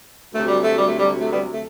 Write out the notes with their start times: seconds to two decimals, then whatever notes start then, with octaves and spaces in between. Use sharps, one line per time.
0.33 D2 C3 F#3 A3
0.48 G3
0.63 A3
0.77 G3
0.88 A3
0.99 G3
1.21 A3
1.31 G3 B3
1.53 A3